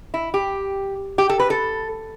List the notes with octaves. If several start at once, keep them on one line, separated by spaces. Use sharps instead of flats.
E4
G4
G4
A4
B4
A4